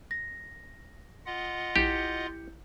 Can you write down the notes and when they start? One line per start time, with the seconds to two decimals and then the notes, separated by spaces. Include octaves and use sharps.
0.11 A#6
1.26 F4 D#5 F#5
1.76 A#1 E4 G4 G6 C#7